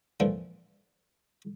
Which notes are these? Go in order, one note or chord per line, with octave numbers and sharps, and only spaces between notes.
A#2 D3 E3 F3